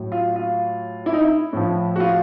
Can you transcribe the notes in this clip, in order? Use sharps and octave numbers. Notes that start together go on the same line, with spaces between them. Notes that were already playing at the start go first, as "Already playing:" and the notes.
Already playing: A2 F#3
F4
F4
E4
D#4
E4
A2 F3
F#4
F4